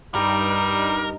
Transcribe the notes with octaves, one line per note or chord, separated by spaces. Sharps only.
G2 G3 D#4 A#4